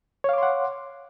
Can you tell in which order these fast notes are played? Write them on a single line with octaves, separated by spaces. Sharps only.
C#5 F5 D6 C6 F#5